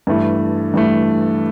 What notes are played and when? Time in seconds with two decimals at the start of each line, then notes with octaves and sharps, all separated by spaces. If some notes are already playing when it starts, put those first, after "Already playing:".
0.07 G2 E3 A3
0.74 G2 E3 A3